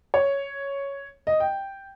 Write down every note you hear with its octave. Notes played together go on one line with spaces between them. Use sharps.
C#5
D#5
G5